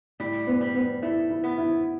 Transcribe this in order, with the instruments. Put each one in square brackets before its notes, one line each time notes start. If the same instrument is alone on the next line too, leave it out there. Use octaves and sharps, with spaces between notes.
[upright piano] A2 [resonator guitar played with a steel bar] G3
[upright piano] B3
[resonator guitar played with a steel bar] G3
[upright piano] B3
[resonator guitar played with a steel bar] A3 [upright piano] E4
[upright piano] E4
[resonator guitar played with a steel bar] B3
[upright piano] E4